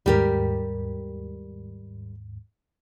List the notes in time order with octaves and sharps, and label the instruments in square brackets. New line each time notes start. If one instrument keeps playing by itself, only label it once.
[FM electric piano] D#2 G#2 [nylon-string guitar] G3 G4 A#4